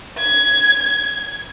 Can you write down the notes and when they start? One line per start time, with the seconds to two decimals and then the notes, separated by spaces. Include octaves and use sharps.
0.18 G#6